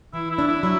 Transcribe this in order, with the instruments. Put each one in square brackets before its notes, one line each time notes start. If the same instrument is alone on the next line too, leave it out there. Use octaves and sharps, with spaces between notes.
[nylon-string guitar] E3 [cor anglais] E4
[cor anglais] E4
[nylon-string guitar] D4
[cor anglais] E4
[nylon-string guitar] F#3 [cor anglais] E4